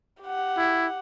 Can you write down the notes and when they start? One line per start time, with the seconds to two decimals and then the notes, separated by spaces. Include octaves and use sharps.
0.22 G4 F#5
0.57 E4